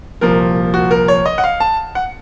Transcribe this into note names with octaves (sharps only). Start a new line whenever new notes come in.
C2 A#2 F3 A#4
F#4
A#4
C#5
D#5
F#5
F5
A5
F#5